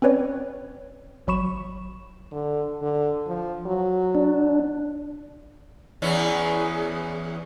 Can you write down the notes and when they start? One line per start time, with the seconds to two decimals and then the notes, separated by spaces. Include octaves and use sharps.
0.02 C4 C#4 B4 C#5 D5
1.27 G#1 F#3 B5 C#6 E7
2.32 D3
2.82 D3
3.28 F3
3.66 F#3
4.15 D4
6.02 E2 E3 C#4 G#4